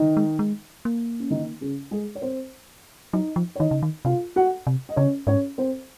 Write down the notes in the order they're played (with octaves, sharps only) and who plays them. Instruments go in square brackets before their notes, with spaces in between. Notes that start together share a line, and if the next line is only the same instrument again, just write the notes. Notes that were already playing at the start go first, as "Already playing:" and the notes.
Already playing: [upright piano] D#3 D#4
[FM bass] G#3
G#3
A#3
[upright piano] C#4
D#3 D#4
C#3 C#4
G#3 G#4
C#5
C4 C5
[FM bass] F#3 [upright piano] D#4 D#5
[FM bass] F3
[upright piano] C#5
[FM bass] D#3 [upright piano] D#4 D#5
[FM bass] C#3
D#3
[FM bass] C3 [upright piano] F4 F5
[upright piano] F#4 F#5
[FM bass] C3
[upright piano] D#5
[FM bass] C#3 [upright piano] C#4 C#5
[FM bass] G#2 [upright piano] C#4 C#5
[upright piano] C4 C5